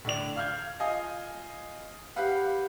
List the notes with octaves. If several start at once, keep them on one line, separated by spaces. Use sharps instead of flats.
A2 D3 D5 F7
F5 F6 G6 G#6
F4 D#5 F5 G#5 D#6
G4 B4 F5 F#5